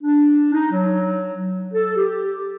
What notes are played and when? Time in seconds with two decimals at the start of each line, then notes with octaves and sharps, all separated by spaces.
0.02 D4
0.53 D#4
0.72 F#3
1.73 A4
1.97 G4